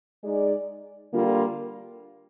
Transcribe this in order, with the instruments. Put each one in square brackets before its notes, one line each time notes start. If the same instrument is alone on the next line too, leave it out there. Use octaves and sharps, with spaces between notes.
[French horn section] G#3 D#4 G#4 D5
D3 G3 A#3 F4